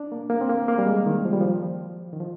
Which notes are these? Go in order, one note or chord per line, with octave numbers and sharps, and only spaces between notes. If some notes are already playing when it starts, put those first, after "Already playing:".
Already playing: D4
A#3
A#3
C4
A#3
A#3
G3
G#3
D#3
F3
G3
F3
D#3
F3